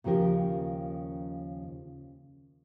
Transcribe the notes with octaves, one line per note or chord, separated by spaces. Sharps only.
D#2 C#3 F3 G4 A#4